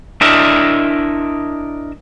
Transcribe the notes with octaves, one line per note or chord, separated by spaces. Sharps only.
D4 E4 A#4 D#5 E5